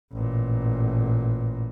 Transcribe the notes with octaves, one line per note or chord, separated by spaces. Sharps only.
A1 A#2